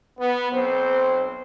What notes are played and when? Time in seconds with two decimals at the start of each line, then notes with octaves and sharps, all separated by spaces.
0.19 B3
0.51 B1 C4 C5